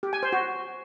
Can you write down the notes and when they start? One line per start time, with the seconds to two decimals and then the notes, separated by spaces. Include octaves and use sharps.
0.03 G4
0.13 G#5
0.23 C5
0.32 F#4